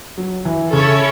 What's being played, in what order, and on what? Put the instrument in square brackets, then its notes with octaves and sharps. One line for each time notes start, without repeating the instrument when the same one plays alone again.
[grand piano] F#3
E3
[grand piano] C#3 [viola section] C#4 E4 A4 C#5